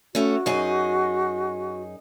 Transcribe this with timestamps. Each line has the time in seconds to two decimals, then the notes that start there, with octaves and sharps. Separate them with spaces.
0.15 A3 C#4 F#4
0.46 F#2 D#4 G#4